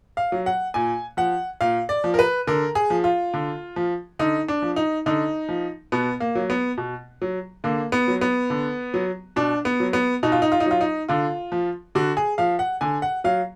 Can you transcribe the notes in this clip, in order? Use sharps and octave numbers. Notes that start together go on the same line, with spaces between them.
F5
F#3
F#5
A#2 G#5
F3 F#5
A#2 F5
D5
F3
A#4
B4
D3 A#4
G#4
F3
F4
D3
F3
D3 D#4
D4
F3
D#4
D3 D#4
F3
B2 B3
A#3
F#3
B3
B2
F#3
D3 A#3
B3
F#3
B3
D3
F#3
B2 D4
B3
F#3
B3
B2 D#4
F4
D#4
F4
D#4
F#3 F4
D#4
D3 F4
F3
D3 F#4
G#4
F3 F5
F#5
D3 G#5
F#5
F#3 F5